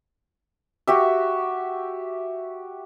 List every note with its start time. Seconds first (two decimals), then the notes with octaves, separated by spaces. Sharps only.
0.87 F#4 G4 E5